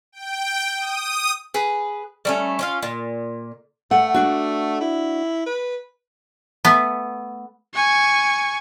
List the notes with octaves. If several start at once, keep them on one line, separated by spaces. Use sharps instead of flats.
G5
D#6
G#4 B4
G3 A3 C#4
C#4 F4 F5
A#2
A3 F#5
D4 F#4
E4
B4
A3 B3
G#5 C#6